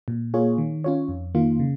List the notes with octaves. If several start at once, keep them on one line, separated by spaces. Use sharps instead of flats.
A#2
A#3 F4 G#4 C#5
D#3
C#4 F4 C#5
F2
D#3 A#3 F4
C#3